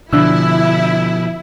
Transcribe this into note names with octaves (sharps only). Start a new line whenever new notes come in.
B2 D3 F3 D4 E4 E6